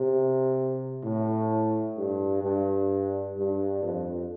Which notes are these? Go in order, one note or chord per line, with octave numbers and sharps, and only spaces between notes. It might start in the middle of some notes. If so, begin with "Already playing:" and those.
Already playing: C3
A2
G2
G2
G2
F2